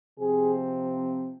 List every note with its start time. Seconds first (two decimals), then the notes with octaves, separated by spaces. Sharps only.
0.19 C3 F3 C4 G#4